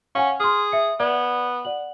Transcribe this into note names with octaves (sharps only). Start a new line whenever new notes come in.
C#4 F5 F#5 G#5
G#4 C6 F6
E5 C#7
B3 D5 G#6
D5 F#5 F#7